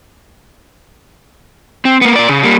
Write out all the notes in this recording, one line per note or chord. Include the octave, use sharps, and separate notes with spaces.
C4
A#3 B3
A#2 D5
C#3
G3 A#3